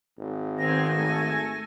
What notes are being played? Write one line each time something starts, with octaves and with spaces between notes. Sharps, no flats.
G#1
D#3 B3 C4 G#5 A#6
A3 A4 G#5